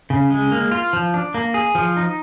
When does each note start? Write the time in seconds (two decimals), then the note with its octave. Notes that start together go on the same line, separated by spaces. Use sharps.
0.10 C#3
0.30 G#3
0.52 A#3
0.71 F4
0.93 F3
1.14 D4
1.34 A#3
1.54 G#4
1.75 F3
1.97 D#4